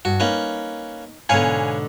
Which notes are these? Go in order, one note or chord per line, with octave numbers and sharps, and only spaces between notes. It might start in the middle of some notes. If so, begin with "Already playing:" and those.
G2 F#4
A#3 C#4 D#4 B4
G#2 B2 D3 B4 C#5 F5 G#5